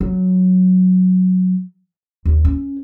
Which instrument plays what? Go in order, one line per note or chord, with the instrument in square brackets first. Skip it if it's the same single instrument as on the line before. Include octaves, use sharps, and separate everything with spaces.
[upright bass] F#3
D#2
C#4